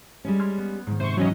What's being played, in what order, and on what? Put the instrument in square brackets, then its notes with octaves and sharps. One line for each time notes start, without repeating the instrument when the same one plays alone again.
[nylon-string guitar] G3 G#3 C#4
[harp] C6 F6 G#6
B3
G#2 D#3
[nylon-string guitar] C3 [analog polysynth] C5 C#6
[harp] E3 [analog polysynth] F#3 C#4 D#5